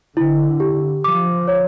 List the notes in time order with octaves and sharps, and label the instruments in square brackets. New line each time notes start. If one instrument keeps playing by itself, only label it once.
[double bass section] D3 [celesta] E4
[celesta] G4
[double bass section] F3 [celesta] D6
[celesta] C#5